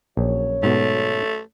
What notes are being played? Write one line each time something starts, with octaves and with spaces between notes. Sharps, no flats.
A#1 F#2 F#3 C#5
G#2 B2 A3 B3